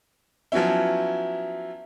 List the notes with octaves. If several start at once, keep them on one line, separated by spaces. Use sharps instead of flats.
F3 F#3 B3 C#4 E4